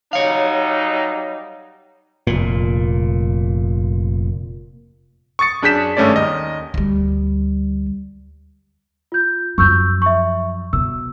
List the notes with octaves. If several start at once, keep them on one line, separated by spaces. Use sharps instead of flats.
F#3 G3 D#4 C#5 F5
F1 A#2
C#6 D#6 A6 C#7
F#2 D4 G#4 G6 B6 E7
G#1 G2 A3 C#4 C#5 D5
D#2 A#4 D#5
D2 G3
F4 G6
F#2 F3 C#6 E6 G6
E5 C#6
B2 E6